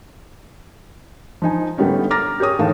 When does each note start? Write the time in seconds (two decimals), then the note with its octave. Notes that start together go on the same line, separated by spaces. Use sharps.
1.42 F3 D#4 G#5
1.77 A2 D3 G3 B3 C#4 D#4
2.10 A#5 D6 F6 A6 A#6
2.40 G4 G#4 C#5 D#6
2.59 A2 D#3 E3 F5 A5